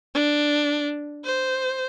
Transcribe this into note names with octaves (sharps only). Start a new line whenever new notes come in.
D4
C5